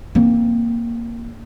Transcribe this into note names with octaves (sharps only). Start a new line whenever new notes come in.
A#3 C4